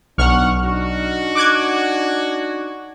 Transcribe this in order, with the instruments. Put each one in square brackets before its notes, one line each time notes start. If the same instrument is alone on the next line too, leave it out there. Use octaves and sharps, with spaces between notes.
[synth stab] B1 C#6 F6 [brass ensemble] D4 D#4 F#5
[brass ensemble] D4 D#4 F#4
[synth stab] D6 F#6 G#6